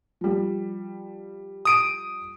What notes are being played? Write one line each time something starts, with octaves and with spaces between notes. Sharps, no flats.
F3 G3
D#6 D7 D#7